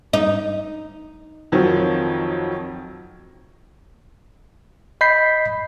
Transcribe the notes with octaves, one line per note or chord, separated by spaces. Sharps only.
D#4
F2 D#3 F3 F#3
D#5 B5 G6 B6 C7